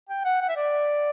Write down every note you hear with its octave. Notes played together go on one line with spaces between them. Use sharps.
G5
F#5
F#5
E5
D5